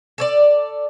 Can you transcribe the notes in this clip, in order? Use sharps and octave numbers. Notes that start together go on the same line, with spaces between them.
A4 C#5 D5